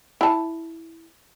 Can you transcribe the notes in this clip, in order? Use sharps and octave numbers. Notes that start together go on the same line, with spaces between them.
E4 A5